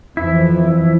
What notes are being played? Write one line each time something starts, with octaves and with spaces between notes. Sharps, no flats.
F2 E3 F3 E4